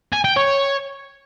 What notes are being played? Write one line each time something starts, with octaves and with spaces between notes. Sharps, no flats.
G#5
G5
C#5